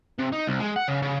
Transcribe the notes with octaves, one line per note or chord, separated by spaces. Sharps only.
C3
D#4
C2
G#3
F#5
C#3
C#3